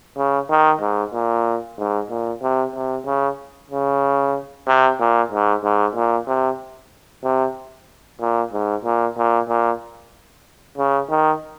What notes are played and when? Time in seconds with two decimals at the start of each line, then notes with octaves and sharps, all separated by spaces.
0.17 C#3
0.50 D#3
0.81 G#2
1.13 A#2
1.78 G#2
2.10 A#2
2.42 C3
2.74 C3
3.06 C#3
3.71 C#3
4.67 C3
5.00 A#2
5.32 G#2
5.64 G#2
5.95 A#2
6.27 C3
7.24 C3
8.20 A#2
8.53 G#2
8.84 A#2
9.17 A#2
9.49 A#2
10.78 C#3
11.10 D#3